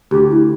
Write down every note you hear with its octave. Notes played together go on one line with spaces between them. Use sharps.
D2 G4
E4